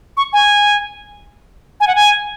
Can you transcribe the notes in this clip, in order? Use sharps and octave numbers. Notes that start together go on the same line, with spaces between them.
C#6
G#5
G#5
F#5
G#5